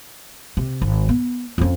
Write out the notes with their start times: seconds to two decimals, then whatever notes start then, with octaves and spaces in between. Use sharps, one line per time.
0.57 C3
0.82 G#1
1.09 B3
1.58 F2 C#4